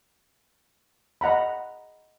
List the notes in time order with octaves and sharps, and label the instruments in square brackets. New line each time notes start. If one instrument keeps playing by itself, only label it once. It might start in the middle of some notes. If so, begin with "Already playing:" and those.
[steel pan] D#5 F#5 A#5 B5